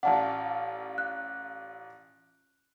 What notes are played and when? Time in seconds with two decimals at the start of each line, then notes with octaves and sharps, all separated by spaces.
0.03 A1 F4 D5 F#5 A5
0.98 F#6